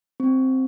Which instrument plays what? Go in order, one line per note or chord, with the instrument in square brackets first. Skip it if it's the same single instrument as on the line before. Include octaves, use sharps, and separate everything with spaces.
[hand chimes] C4